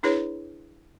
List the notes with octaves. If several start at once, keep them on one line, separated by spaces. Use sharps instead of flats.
D4 E4 G#4 B4 C#5